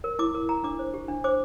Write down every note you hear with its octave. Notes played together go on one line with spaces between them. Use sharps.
A#4
E4 D6
A#4
E4 A#5
D4 D6
C5
G4
D4
C5 D6